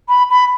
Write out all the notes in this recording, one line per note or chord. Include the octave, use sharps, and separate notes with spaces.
B5
B5